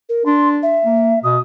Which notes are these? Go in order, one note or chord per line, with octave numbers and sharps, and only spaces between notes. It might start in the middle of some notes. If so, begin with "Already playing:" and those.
A#4
D4 C6
E5
A#3
B2 D#6